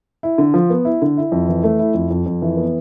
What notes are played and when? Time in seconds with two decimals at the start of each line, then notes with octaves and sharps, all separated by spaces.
0.23 E4
0.38 D3
0.54 F3
0.70 B3
0.85 E4
1.02 D3
1.17 E4
1.32 F2
1.49 E3
1.64 A3
1.79 E4
1.94 F2
2.11 F2
2.26 F2
2.42 E3
2.57 B3